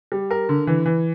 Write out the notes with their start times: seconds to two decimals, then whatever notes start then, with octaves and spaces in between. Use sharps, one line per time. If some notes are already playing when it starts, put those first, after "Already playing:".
0.12 G3
0.31 A#4
0.49 D3
0.67 E3
0.86 E3